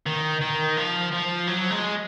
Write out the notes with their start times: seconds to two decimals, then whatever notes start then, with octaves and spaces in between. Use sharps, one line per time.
0.06 D#3
0.41 D#3
0.77 F3
1.12 F3
1.47 F#3
1.70 G#3